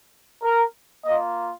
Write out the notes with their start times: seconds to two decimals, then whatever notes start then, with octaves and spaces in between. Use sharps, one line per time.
0.42 A#4
1.05 A#3 F4 D#5